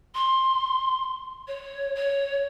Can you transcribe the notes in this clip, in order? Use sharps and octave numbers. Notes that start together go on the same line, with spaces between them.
C6
C#5
C#5